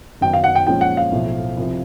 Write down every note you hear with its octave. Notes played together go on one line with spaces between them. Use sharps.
F#2 D#3 F#3 B3 D#4 G5
F5
F#5
G5
A#2 F3 G#3 C#4 G5
F#5
F5
B1 A2 F3 A3
C2 C3 F3